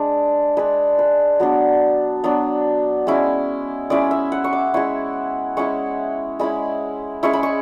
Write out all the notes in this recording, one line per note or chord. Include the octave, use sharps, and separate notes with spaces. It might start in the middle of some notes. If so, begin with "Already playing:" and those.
Already playing: G#3 D4
G#3 D4 B4
B4
F#3 B3 D4
F#3 B3 D4
G#3 C#4 E4
G#3 C#4 E4 D5
E5
F#5
C#6
D6
G#3 C#4 E4 C#6
G#3 C#4 E4 C#6
G#3 C#4 E4 B5
G#3 C#4 E4 C#6
B5
C#6